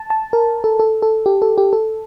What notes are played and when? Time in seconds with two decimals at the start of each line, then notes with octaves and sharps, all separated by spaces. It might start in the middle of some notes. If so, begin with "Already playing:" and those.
Already playing: A5
0.10 A5
0.33 A#4
0.64 A4
0.80 A4
1.02 A4
1.26 G4
1.42 A4
1.58 G4
1.73 A4